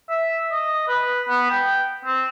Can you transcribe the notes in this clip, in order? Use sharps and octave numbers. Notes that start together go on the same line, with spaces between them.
E5
D#5
B4
B3
G5
C4